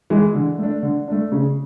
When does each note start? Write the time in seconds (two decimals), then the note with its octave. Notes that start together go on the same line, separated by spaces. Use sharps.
0.10 E3 G#3
0.35 D3
0.58 A3 D4
0.83 D3
1.08 A3 D4
1.32 C#3